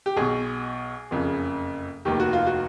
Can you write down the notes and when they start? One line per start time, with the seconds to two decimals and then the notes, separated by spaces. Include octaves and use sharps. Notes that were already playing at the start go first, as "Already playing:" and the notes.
0.06 G4
0.16 B1 B2 G#4
1.11 F#1 F2 C#3
2.05 F1 D#2 D#3 G4
2.20 F#4
2.33 F4
2.47 F#4